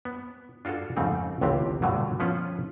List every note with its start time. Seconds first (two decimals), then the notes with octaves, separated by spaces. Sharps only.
0.05 B3
0.65 D4 F4 F#4 G#4 A4
0.96 F2 G#2 C#3 A3 C4 D#4
1.41 G1 C#2 C3 E3 C4 G4
1.82 G2 B2 D3 F#3 A3
2.20 F3 B3 C#4 F4 B4